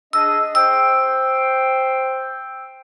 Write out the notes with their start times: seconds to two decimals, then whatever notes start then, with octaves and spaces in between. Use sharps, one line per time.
0.13 D4 G#4 D#5 E6
0.55 C5 G5 E6